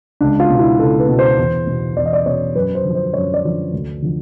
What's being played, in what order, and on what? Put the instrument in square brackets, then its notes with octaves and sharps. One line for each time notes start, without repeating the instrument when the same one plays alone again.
[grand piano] C#2 D4
F4
B2
E4
C#2 A4
B4
B2
C5
E2
B2
E2 D5
D#5
D5
B2 C#5
F#2 B4
C5
D3 F3
C5
F#2 C#5
D5
D3 F3
D2
D3 F3